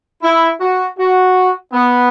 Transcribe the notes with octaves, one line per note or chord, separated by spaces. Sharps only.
E4
F#4
F#4
B3